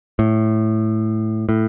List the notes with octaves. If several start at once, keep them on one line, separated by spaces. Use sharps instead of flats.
A2
A2